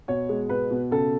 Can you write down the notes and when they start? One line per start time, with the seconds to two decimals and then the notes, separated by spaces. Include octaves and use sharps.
0.08 B2 C#5
0.29 G#3
0.49 B2 B4
0.71 B2
0.91 C#3 A4